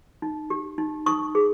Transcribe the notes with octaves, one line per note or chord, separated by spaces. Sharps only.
D#4
G4
D#4
D#4 C#6 D#6
G#4